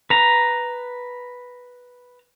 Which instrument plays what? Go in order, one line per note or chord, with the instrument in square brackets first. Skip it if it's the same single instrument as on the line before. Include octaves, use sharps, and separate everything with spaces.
[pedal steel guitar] B4 A#5